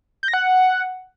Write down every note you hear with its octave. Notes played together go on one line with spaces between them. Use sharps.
G6
A#6
F#5